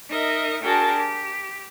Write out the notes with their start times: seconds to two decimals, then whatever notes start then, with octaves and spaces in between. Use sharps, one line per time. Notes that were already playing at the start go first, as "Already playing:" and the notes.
0.11 D#4 A#4 D#5 E5
0.63 D4 F#4 G#4 A#4 G5 A5
0.98 G4